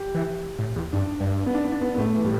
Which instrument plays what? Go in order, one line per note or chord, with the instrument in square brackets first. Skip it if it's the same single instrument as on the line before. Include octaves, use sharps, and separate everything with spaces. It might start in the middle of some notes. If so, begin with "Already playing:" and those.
Already playing: [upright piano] G4
[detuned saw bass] E3
A2
E2
[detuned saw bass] G2 [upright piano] D4
[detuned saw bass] G2
[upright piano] B3
D4
B3
D4
B3
B3
[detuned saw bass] A2 [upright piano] A3
[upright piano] E3
[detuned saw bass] A2 [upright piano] G3